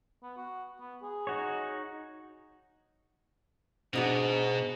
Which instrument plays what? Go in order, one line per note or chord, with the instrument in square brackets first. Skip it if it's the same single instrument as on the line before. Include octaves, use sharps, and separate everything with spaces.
[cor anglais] B3
F#4
B3
G#4
[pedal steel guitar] D#4 F#4 C#5
[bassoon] G#2 [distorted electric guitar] B2 [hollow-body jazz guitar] D4 D#4 F#4